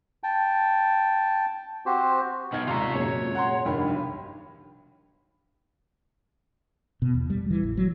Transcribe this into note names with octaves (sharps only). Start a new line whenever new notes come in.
G5 A5
C4 F#4 G4 C5
B2 D#4 F6 G#6
D#2 G#2 C3 F4 A#5 C#6
F#2 A#2 G#3 C#5
F#5 A#5 C6
F1 G2 D#3 G5 B5
B1
B2
E2
G3
E3
A1
F#3